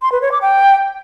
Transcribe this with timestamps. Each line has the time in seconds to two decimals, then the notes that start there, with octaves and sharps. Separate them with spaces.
0.02 C6
0.12 B4
0.22 C#5
0.32 D6
0.42 G5